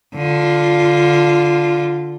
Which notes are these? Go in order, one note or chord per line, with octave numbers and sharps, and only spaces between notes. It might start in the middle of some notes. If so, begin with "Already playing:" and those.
D3 F4